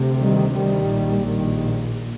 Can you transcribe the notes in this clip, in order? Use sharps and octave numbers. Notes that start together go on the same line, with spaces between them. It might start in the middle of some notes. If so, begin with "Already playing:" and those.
Already playing: D2 C3
D#3 G3
D#3 G3
A#1 A#2
D#3 G3